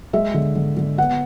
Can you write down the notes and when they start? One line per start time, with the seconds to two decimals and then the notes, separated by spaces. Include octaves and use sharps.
0.13 G#3 E5
0.34 D3
0.56 D3
0.77 D3
0.98 B3 F#5